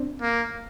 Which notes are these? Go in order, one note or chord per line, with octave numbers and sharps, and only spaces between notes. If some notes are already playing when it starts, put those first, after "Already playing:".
Already playing: C4 D4
A#3